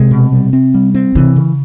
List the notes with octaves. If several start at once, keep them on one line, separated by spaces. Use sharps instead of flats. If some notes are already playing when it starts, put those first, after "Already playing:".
Already playing: C3 G#3
B2
G3
C4
G3
C4
C3 E3
C#3